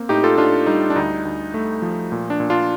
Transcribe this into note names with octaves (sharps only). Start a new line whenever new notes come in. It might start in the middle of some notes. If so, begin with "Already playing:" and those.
Already playing: A#3 C4
A2 D#4 G4
F4 A4
A2 D4 F4
G3 D#4
D4
D2 D#4
D2
A3
F3
A#2
D4
A#2
D4 F4